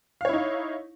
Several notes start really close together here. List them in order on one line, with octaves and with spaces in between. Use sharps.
F5 C#5 E4 D#4